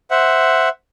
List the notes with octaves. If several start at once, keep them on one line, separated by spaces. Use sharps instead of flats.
C5 E5 F#5